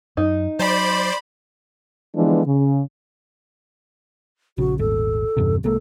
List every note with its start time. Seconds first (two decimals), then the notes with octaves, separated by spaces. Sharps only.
0.17 F#2 D#4
0.59 F#3 C5 D5 B5
2.16 D3 E3 F3 G#3 B3 D4
2.46 C#3
4.58 A#1 C#3 F#4
4.79 D#1 G#1 A4
5.37 E2 G2 C3
5.64 C2 G#3 A#3 A4